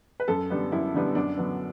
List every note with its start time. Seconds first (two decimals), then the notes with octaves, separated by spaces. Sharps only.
0.20 B4
0.28 F#2 A4
0.50 D3 G3 B3
0.72 F#2 E4
0.94 D3 G3 B3
1.15 F#2 D4
1.38 D3 F#3 B3